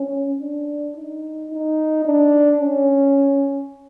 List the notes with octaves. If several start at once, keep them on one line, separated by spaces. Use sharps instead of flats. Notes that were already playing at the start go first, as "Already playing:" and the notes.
Already playing: C#4
D4
D#4
D#4
D4
C#4